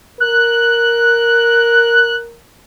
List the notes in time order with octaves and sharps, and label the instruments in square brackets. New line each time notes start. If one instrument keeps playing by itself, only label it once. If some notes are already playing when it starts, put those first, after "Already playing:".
[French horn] A#4 [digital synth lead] F#6